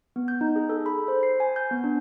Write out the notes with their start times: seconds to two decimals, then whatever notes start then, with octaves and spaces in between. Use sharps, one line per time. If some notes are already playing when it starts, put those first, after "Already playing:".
0.16 B3
0.28 G6
0.41 D#4
0.56 G#4
0.69 A4
0.86 B5
1.08 C5
1.23 C7
1.40 G#5
1.56 G6
1.71 B3
1.84 D4